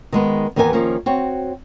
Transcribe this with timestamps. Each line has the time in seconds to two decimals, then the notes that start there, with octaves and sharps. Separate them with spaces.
0.13 D#3 G#3 B3
0.56 D#2 E3 B3 A#4 D5 G#5
0.73 D#3 F3 A#3 C#4
1.06 C4 F#4 C#5